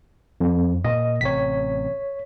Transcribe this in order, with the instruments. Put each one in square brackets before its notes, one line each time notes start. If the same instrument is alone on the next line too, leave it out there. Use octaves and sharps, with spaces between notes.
[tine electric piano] F2
[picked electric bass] A#2 A#3 [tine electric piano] D#5
[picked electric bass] A1 C3 [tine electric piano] C#5 B6